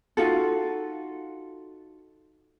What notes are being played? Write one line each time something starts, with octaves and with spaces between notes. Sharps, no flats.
D#4 F4 F#4 A4